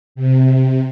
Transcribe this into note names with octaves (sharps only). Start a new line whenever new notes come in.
C3